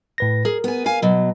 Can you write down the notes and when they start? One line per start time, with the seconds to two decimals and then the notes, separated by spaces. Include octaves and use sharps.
0.18 A2 B4 A#6
0.45 G#4 A#4
0.64 B3 G#5
0.86 F5 G#5
1.02 B2 F#3